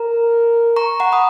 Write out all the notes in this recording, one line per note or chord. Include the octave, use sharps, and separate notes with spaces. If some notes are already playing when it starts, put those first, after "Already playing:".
Already playing: A#4 A#5
A#5 C#6
F#5 A#5
B5 D#6